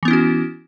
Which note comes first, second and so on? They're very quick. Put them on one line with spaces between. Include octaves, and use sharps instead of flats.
E3 B3 E4 C#4 F#4